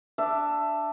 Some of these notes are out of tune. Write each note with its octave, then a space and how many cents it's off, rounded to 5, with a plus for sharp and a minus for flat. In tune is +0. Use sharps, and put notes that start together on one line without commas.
D4 +5 E5 +15